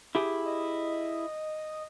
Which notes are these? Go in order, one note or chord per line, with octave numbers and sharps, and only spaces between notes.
E4 G4 G#4
D#5